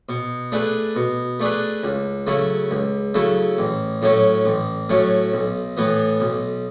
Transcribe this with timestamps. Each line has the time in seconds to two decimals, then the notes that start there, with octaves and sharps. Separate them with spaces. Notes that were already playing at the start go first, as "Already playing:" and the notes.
0.09 B2
0.52 A3 D4 G#4 B4
0.96 B2
1.40 A3 D4 G#4 B4
1.83 C#2
2.27 C#3 F#3 A3 E4
2.71 C#2
3.15 C#3 F#3 A3 E4
3.58 A1
4.02 A2 F#3 A3 C#4
4.46 A1
4.89 A2 F#3 A3 C#4
5.33 B1
5.77 A2 E3 B3
6.20 B1